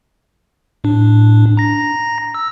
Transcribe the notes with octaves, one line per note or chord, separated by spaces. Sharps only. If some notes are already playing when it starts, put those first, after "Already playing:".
A2 D4
A#5 A#6
E6